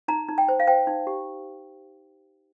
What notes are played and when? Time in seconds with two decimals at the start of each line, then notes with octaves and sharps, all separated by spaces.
0.08 D#4 A#5
0.28 D#4
0.38 G5
0.48 C5
0.60 F5
0.67 C5 G5
0.87 D#4
1.07 G4